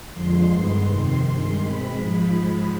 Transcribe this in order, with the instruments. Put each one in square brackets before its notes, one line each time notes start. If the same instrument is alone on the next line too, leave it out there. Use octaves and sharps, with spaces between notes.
[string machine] F2 D3 F3 G#3 C6
G2 D#3 G#3 B3
F2 C3 D#3 C6
G2 D#3 G#3
B2 G#3 C4 B5
G#2 F3 G#3